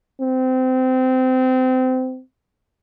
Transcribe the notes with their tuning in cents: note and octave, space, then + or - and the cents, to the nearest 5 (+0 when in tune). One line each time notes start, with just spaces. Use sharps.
C4 -25